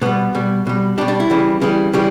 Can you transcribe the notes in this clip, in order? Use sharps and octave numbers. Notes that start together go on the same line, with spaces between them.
B2 G3 B3
B2 G3
B2 G3
B2 G3 D4
D4
E4
C#3 E3 G3
C#3 E3 G3
C#3 E3 G3 G4